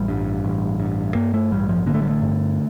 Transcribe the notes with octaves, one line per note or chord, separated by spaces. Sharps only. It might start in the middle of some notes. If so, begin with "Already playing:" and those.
Already playing: A1 G3
G2
A1
G2
G2 A#3
A3
A1 G3
F3
D3 A#3
A3
G3
A3
G2